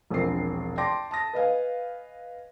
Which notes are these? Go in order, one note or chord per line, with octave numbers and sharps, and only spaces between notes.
E1 A#1 F3 C4 A#4 C7
D5 G5 A5 C6 D6 A#6
A5 D#6 A#6
B4 D#5 F5 G#5